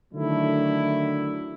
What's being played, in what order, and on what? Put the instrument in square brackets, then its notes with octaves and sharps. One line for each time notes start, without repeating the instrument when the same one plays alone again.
[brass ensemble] D3 D#3 F#3 A3 D4 E4